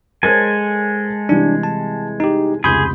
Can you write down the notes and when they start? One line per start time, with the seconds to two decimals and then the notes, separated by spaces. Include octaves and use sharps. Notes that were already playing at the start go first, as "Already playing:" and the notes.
0.23 G#3 A4 A#4 C5 C#5 G#5
1.29 C3 E3 G3 D4
1.63 A5
2.20 D#4 G4
2.64 F1 C#2 G#4 B5 C6 G6